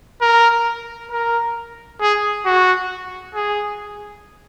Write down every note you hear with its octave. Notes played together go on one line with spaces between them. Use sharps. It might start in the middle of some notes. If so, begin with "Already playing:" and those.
A#4
A#4
G#4
F#4
G#4